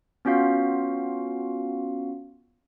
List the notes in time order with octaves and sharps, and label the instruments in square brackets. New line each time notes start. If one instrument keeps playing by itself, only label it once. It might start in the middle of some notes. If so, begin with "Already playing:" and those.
[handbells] B3 C#4 F4 F#4 F5